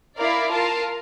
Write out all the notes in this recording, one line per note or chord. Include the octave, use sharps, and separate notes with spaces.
E4 A#4 D5 F5
F4 A#4 F5 A5